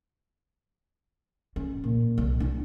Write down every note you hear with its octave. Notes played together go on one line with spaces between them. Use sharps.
C#4
A#2
C2
D4 E4